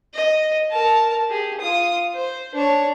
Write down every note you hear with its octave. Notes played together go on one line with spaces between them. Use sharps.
D#5
A#4 A5
G4 G#4
F4 D#6
C5
D4 C#5